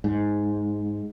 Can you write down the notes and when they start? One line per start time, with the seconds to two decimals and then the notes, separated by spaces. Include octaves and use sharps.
0.04 G#2